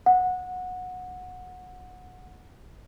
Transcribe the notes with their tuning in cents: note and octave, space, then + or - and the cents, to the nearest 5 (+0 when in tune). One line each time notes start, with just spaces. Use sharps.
F#5 -20